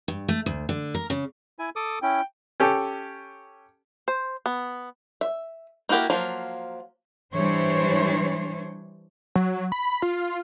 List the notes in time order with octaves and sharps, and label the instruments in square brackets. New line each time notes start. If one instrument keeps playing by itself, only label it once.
[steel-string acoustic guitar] G2
A3
D2
D3
A#4
C#3
[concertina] E4 G#5
A4 D6 D#6
[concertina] C#4 E4 [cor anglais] G5
[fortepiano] C#4 G4 A4
[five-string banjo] C5
B3
E5
A#3 E4 F#4 G4 A#4
F3 F#3 A#3 F4
[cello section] E3 G3 D4 C5 C#5
[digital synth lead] F#3
B5
F4